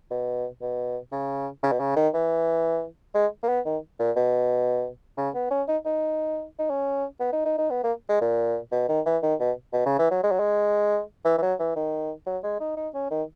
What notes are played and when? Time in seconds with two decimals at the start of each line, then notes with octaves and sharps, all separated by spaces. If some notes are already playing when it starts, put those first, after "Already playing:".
0.10 B2
0.61 B2
1.12 C#3
1.63 C#3
1.72 B2
1.80 C#3
1.96 D#3
2.14 E3
3.15 G#3
3.44 A#3
3.48 B3
3.65 D#3
3.99 A#2
4.16 B2
5.18 C#3
5.34 B3
5.50 C#4
5.68 D#4
5.85 D#4
6.59 D#4
6.69 C#4
7.20 B3
7.33 D#4
7.45 D#4
7.58 D#4
7.70 B3
7.83 A#3
8.09 G#3
8.21 A#2
8.72 B2
8.89 D#3
9.06 E3
9.23 D#3
9.40 B2
9.73 B2
9.86 C#3
9.99 E3
10.11 F#3
10.23 G#3
10.31 F#3
10.39 G#3
11.25 E3
11.38 E3
11.42 F#3
11.59 E3
11.76 D#3
12.26 F#3
12.43 G#3
12.60 D#4
12.77 D#4
12.94 C#4
13.11 D#3